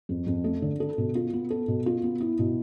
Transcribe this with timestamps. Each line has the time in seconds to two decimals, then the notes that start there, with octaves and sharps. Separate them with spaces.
0.09 F2
0.27 F2
0.44 A3
0.62 D3
0.80 A4
0.98 B2
1.15 F4
1.33 B3
1.50 A4
1.68 B2
1.86 F4
2.03 B3
2.20 E4
2.39 B2